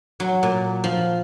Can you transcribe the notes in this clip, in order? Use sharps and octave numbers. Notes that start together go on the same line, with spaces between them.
F#3
A#2
F3